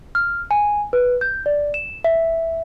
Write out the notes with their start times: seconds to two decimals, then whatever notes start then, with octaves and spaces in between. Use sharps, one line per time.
0.15 F6
0.51 G#5
0.93 B4
1.21 G6
1.46 D5
1.74 E7
2.04 E5